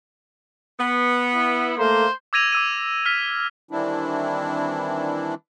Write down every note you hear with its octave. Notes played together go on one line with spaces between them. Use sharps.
B3
E4
A3 A#3 C5
D6 E6 G#6 A#6 D#7 F7
D6 E6 D#7
F6 B6
D#3 E3 G3 C4 D4 E4